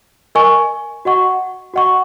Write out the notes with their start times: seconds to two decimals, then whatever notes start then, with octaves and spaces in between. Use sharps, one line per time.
0.35 A#4 D#5 G#5 C#6
1.05 F#4 D#5 F#5 C#6
1.74 F#4 D#5 F#5 C#6